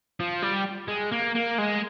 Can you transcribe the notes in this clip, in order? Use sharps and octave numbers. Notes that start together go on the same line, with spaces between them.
F3
G3
G#3
A#3
A#3
G#3